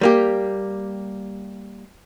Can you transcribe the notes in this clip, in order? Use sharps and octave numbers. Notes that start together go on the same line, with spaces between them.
G3 A#3 G4